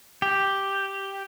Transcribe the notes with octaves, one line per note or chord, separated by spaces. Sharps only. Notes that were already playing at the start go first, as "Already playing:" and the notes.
G4